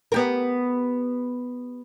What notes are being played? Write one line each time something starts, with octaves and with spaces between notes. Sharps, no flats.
B3 G4 A#4